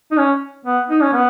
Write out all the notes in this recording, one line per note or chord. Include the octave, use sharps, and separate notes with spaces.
D#4
C#4
B3
D#4
C#4
B3